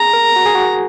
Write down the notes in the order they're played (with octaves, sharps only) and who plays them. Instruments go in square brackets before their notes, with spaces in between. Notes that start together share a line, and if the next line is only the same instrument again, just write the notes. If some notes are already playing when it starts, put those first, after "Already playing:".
Already playing: [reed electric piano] G#4 [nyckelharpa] A#5
[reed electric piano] A#4
F#4
G#4
F#4